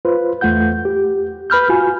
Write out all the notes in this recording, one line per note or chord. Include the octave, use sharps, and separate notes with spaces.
F4 B4 C5
E2 A3 F4 F#5 G6
G4
B4 B5 F6 G6
F4 F#4 G#5